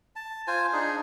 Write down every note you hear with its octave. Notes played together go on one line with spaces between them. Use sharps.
A5
F4 C5 G#5
D4 D#4 G#4